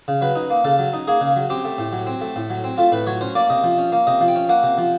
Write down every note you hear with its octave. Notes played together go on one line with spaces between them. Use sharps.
C#3
F#3 B4
D#4
A#3
C#3 A4
F#3
D#4
A#3 G#4
C#3
F#3
C4 G4
A3
A2
F#3
C4
A3
A2
F#3
C4
A3 F4
A2 B4
F#3 C#5
C#4 C5
A#3 D5
C3 D#5
F3
C#4
A#3
C3 D#5
F3
G5
C#4
A#3 F#5
C3
F3